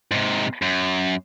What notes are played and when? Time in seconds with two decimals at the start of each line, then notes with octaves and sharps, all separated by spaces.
0.11 G#2 C3
0.62 F#2